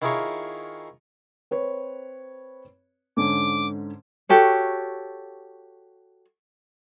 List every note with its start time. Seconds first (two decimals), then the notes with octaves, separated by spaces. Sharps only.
0.02 D#3 E4 F4 G#4 A#4 C#5
1.51 C4 B4 C#5
3.17 G#2 D3 C#4 D6
4.29 F#4 G4 A4 C#5